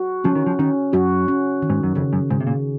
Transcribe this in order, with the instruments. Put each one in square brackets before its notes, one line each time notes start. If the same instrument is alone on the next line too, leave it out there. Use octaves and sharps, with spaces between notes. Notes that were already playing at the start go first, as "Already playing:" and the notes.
Already playing: [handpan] F#4
[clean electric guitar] F3 [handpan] C#4
[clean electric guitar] D#3
F3
[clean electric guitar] D#3 [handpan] C#4
[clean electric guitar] F#2 [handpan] F#4
[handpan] C#4
D#3
[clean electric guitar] G#2
F#2
[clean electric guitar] F2 [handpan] C#3
[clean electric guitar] F#2
[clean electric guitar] G#2 [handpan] C#3
[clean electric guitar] C3
A#2